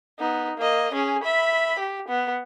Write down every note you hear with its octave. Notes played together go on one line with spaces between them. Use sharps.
B3 D#4
A#3 D#5
C#4 G#4
E5 B5
G4
B3